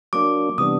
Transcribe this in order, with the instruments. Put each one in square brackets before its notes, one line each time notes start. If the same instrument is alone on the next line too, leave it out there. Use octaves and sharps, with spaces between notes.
[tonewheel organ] F#3 A#3 D4 [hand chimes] D6
[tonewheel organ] C3 E3 G3 B3 D4 [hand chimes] D#6